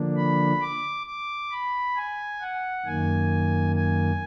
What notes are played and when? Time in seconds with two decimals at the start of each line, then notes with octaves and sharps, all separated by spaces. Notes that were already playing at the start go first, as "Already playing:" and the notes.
Already playing: D3 F3 A#3 D4
0.17 B5
0.62 D6
1.07 D6
1.51 B5
1.96 G#5
2.41 F#5
2.86 F#2 D#3 A#3 G#5
3.76 G#5